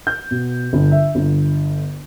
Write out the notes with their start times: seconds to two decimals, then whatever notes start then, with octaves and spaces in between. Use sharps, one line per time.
0.07 G6
0.31 B2
0.73 G1
0.91 E5
1.15 G1